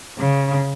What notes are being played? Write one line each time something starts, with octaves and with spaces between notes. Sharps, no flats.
C#3